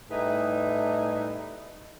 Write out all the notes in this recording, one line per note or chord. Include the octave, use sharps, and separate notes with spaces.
A2 G3 D#4 G#4 B4 E5